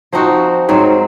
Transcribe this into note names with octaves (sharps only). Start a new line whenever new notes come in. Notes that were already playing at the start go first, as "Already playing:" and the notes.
F3 C4 D#4 F#4
G#2 F#3 C4